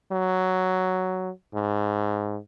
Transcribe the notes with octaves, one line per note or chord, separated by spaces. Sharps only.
F#3
G#2